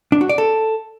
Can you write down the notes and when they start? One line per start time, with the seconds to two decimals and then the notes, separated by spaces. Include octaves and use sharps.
0.12 D4
0.21 F#4
0.29 D5
0.38 A4